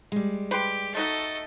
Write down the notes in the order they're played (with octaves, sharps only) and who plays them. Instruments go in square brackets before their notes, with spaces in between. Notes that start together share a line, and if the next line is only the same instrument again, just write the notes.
[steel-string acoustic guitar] G3 G#3
[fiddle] G4 [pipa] B4 C5 B5
[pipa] A3 D#4 F#4 [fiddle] A4 D#5